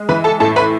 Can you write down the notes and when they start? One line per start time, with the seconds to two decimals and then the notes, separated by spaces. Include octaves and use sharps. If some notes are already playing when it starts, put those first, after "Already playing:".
Already playing: G#3
0.09 E3 B4 B5
0.24 A4 A5
0.40 A2 A4 A5
0.56 B4 B5